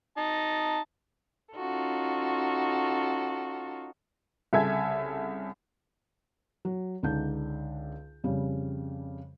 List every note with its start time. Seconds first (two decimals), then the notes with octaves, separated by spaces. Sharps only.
0.17 D#4 A5
1.55 C#4 D#4 F4 F#4 A4
4.53 C2 C#3 A4 E5 G#5 G#6
6.65 F#3
7.03 C#2 D3 D4 D#4 G6
8.24 F2 C#3 G3